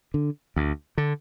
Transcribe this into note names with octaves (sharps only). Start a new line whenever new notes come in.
D3
D2
D3